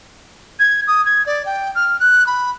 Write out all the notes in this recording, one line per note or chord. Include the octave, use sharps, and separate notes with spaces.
G#6
D#6
G#6
D5
G5
F6
F#6
B5